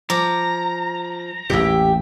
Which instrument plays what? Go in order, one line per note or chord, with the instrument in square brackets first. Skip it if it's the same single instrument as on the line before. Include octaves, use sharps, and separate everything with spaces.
[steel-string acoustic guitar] F3 [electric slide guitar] A#5 [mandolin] D6
[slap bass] A1 E2 A#2 [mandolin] G4 E5